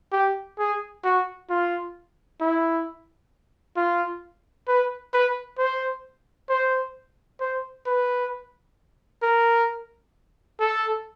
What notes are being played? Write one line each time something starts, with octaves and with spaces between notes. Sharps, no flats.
G4
G#4
F#4
F4
E4
F4
B4
B4
C5
C5
C5
B4
A#4
A4